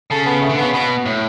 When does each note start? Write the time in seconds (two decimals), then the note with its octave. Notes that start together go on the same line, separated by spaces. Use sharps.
0.11 C#3 A4
0.26 B3
0.42 A3
0.49 D3
0.58 C#3 B3
0.73 B2 B3
1.06 A2